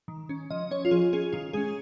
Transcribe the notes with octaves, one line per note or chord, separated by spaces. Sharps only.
D#3
C#4
F3 D#5
C#4 C#5
F4
F3 G#4
C#4 G#4
D#3 F4
G#3 C#4 G#4